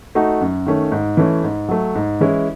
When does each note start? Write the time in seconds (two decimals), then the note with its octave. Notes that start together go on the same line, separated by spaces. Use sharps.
0.15 A3 D#4 F#4
0.41 F#2
0.66 D#3 A3 C#4
0.92 G#2
1.17 E3 A3 C#4
1.43 G#2
1.68 F#3 A3
1.95 G#2
2.20 E3 G#3 C#4 E4